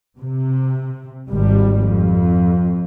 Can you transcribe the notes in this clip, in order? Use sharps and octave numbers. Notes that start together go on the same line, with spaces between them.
C3
G#1 G#2 G3
F2